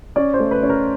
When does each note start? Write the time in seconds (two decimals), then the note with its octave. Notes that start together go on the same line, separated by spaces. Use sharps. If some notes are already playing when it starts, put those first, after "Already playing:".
0.16 C#4 D5
0.34 C5
0.40 A3
0.51 B4
0.63 C#4
0.69 A#4